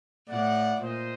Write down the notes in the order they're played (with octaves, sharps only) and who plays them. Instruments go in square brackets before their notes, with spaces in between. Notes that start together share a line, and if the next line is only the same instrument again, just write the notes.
[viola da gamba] A2 [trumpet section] D5 F#5
[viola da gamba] A#2 [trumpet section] C5 D#5